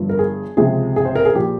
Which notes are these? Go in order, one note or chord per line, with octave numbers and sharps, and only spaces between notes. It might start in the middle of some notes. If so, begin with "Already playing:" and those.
Already playing: G1 G2 F3
A#4
G#4
C#2 C3 F3 G#3 G#4
G#4
C5
A#4
G#4
A#2 F3 G4